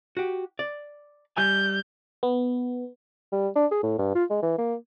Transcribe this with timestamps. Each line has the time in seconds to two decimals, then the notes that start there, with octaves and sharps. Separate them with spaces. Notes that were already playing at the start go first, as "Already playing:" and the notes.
0.17 F#4 G4
0.59 D5
1.37 G3 G#5 G6
2.23 B3
3.32 G3
3.56 D4
3.71 G#4
3.83 A2
3.98 G2
4.15 F4
4.30 G#3
4.43 E3
4.58 A#3